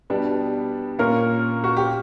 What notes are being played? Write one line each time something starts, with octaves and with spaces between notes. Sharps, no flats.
B2 G3 B3 D4
A#2 A#3 C#4 A#4
F#4
G4